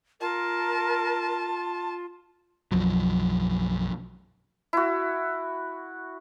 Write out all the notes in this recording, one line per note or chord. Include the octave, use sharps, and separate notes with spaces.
F4 A#4 A5
B1 F#2 F3 F#3
E4 F#4